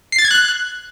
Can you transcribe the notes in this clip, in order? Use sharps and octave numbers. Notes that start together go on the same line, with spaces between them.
C7
A6
G#6
F#6